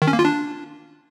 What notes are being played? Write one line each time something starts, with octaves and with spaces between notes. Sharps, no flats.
D#3
C#4
A#3
F4
D4